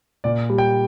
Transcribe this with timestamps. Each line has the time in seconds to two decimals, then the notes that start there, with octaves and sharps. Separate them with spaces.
0.24 A#2 D5
0.50 G3
0.58 G5